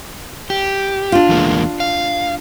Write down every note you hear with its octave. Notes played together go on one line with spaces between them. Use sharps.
G4
D4 F4
E2 G#3 A#3
F5